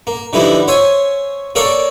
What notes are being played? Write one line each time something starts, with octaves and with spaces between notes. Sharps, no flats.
A#3
D3 E3 F3 G3 D#4 E4
C5 C#5 E5 G#5
A#3 A4 A#4 C#5 D5 F5